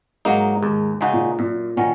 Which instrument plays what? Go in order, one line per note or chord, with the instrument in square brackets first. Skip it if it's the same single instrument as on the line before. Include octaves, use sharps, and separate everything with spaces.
[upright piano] G#2 [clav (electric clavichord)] F#3 A#3 D#4
[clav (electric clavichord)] D#2 [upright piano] G#2
[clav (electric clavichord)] C#3 G#3 D#4 F#4
[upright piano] A#2
[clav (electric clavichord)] F#2 [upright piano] A#2
[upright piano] A#2 [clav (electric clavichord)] D#3 F#3 C#4